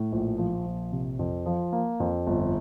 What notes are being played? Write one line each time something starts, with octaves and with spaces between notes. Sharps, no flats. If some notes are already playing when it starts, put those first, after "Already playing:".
Already playing: A2
A#1
F3
A#1
C3
F2
F3
A#3
F2
G1